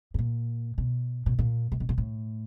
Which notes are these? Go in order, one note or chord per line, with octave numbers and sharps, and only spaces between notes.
A2
A#2
B2
B2
A#2
C3
B2
A#2
A2